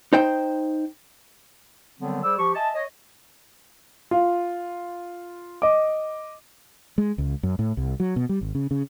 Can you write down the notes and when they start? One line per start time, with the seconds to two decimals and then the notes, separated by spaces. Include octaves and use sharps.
0.13 D#4 C5 G5
2.00 D3 D#3 F#3 G3 B3 C4
2.23 G3 G#4 C5 D5 E6
2.38 F3 G4 C#6
2.54 D#5 E5 G#5 A5
2.75 C#5 D#5
4.11 F4
5.62 D#5 D6
6.98 G#3
7.18 C#2
7.43 F#2
7.59 A2
7.77 C2
8.00 F#3
8.16 B2
8.29 G3
8.41 G#1
8.55 C#3
8.71 C#3